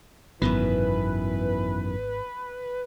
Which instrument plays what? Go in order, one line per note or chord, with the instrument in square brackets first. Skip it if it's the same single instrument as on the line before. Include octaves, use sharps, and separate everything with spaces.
[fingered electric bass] G#1 B3 [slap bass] F#2 B2 D#3 [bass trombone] E3 [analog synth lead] B4